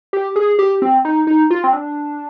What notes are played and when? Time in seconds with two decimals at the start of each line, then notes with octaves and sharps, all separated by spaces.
0.13 G4
0.36 G#4
0.59 G4
0.82 C4
1.05 D#4
1.27 D#4
1.51 F4
1.64 C4
1.73 D4